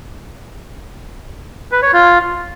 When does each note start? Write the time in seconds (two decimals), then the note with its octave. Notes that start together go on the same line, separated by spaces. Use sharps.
1.72 B4
1.82 C#5
1.93 F4